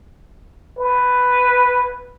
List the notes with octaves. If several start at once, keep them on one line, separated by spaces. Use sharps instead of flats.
B4